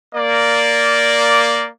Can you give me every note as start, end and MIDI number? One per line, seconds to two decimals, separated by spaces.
0.15 1.68 58
0.15 1.68 74